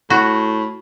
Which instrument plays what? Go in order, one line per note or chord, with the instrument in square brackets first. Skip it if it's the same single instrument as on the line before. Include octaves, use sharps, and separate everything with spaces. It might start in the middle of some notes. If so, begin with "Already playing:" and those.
[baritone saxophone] A2 [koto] F#4